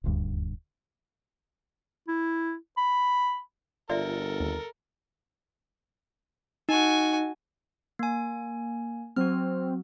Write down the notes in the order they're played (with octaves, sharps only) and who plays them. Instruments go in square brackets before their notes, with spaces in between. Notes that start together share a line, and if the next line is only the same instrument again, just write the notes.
[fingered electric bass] D#1 D2 G2
[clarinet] E4
B5
[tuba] G1 [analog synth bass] F4 [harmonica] A4 A#4 [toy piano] D5 E5
[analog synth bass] D#2
[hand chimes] D#4 [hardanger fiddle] F#4 G#5
[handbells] A#3 G#5
[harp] F#3 [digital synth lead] C4 [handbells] F#4 F6